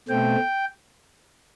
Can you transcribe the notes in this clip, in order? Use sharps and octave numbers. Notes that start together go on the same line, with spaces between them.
B2 A3 C4 G5